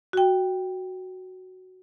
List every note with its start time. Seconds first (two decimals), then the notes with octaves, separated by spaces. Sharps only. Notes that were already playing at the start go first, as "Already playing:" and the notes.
0.13 F#4 G5